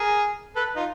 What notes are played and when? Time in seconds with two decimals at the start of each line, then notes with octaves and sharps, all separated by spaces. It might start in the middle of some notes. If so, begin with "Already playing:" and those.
Already playing: G#4 A#4
0.56 A4 B4
0.76 D#4 F4